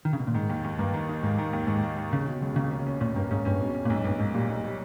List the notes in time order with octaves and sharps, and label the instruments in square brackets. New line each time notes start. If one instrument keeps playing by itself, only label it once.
[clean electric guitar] D#3
C#3
B2
A#2
[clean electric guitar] G#2 [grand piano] D#3
[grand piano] D#2
D#2
[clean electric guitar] G2 [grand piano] A#3
[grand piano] D#3
D#4
[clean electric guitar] G#2 [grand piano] A#3
[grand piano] D#3
D#2
[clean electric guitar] G#2 [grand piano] D#3
[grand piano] A#3
D#3
[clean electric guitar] C#3 [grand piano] C#4
[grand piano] B2
C#2
[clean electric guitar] C#3 [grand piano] A#3
[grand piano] C#4
C#4
[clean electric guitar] A#2 [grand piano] C#4
[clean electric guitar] G2 [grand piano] A#3
[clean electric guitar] G#2 [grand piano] C#4
[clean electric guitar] G2 [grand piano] C#4
[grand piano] B2
C#4
[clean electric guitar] A#2
[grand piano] B1 [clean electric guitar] G#2
[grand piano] B1 [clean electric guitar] G2
[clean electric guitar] G#2 [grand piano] A#3
[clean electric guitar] A#2 [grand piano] G3
[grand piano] B1
G3